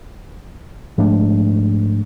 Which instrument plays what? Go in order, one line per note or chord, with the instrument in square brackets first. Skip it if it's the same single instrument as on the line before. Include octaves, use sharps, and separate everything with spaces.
[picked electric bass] G#2 F3 A3 D4